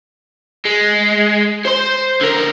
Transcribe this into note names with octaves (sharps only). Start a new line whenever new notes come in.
G#3
C5 C6
D3 A#4